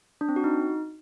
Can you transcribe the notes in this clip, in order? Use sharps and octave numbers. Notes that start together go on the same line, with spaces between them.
D4
C4
F#4
D#4